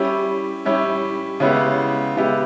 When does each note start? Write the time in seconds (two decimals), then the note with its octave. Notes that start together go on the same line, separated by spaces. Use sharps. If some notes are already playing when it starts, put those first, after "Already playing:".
Already playing: G3 C#4 E4 G4
0.65 G3 C#4 E4 G4
1.40 C#3 G#3 B3 E4 G4
2.16 C#3 G#3 B3 E4 G4